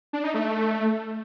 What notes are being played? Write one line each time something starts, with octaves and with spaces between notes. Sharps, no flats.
D4
D#4
A3